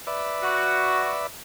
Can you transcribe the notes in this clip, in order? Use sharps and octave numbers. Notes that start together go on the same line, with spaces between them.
B4 D5 E5
F#4